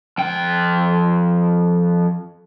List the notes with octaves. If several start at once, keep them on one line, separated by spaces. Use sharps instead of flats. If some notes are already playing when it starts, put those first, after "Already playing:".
F2 G5